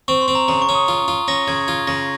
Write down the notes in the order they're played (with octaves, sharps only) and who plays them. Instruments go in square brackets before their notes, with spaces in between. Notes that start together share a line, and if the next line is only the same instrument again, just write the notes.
[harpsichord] C4 [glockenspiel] C#6
[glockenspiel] C6
[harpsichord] C4
[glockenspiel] A#5
[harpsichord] C#3 [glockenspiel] A#5
[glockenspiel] C#6
[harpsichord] C#4
[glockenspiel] D#6
[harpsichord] F4
F4
[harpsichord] C#4 [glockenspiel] A#6
[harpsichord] C#3 [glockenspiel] G#6
[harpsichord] F4 [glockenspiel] G#6
[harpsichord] C#3 [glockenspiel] A#6